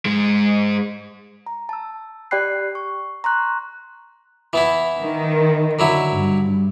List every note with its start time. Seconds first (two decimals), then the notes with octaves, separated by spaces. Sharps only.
0.05 G#2 G#3
1.46 A#5
1.69 A5 E6
2.31 G4 D5 G5 B5 F#6 C7
2.75 C#6
3.24 A#5 C6 C#6 F#6
4.53 E3 B3 E4
4.99 D#3
5.79 D3 F#3 E4
6.12 G2